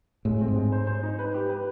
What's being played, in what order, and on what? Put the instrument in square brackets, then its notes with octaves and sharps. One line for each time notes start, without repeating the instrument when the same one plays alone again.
[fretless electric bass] A2 [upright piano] G#3
[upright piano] C4
[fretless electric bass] G#2
[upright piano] G#3
C5
C5
D#4
B4
G4
B4